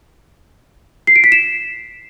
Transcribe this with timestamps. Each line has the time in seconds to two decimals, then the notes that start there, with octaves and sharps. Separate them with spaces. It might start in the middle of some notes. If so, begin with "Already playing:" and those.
1.07 C7
1.16 D7
1.24 B6
1.32 E7